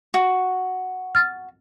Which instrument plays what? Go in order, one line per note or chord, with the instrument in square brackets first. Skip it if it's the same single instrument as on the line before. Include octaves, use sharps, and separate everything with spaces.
[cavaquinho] F#4
[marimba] F6 A6